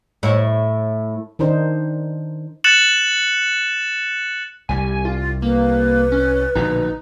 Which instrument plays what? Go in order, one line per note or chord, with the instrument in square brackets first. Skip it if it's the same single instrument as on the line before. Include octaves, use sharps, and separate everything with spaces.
[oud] A2 E4 C#5
[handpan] D#3 D4 D#4 C5
[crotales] F#6 A6 C#7 E7 F#7
[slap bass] C2 G3 [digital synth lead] G#5
[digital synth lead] F4
[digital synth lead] A#3 [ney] B4
[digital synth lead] C#4
[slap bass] A#1 B2 D3 [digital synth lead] D#4